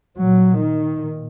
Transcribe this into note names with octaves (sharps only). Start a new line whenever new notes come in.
A#2 F#3
D#3
A#2